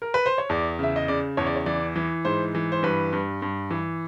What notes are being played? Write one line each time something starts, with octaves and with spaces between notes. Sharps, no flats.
A#4
B4
C5
C#5
E2 D5
C#3 E5
D#5
C#3 D5
E2 C#5
D5
C#5
E3 D5
E3
G#2 C5
E3
C5
G2 B4
G2
G2
E3